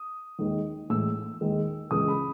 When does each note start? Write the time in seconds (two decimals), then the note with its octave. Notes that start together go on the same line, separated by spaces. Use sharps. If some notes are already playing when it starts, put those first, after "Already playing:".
Already playing: D#6
0.39 D#2 D#3 G#3
0.90 A2 E3 G#3 E6
1.41 D#2 D#3 G#3
1.91 C#2 C#3 E3 G#3 D#6
2.08 B5